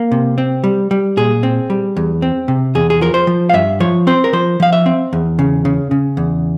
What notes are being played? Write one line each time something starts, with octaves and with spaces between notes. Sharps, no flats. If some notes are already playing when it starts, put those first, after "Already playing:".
Already playing: A#3
C3
C4
G3
G3
A#2 G#4
C4
G3
E2
C4
C3
E2 G#4
G#4
F3 A#4
C5
F3
F5
G2 E5
F3 C#5
C4 C5
A#4
F3 C5
F3 F5
E5
C4
E2
C#3
C#3
C#3
E2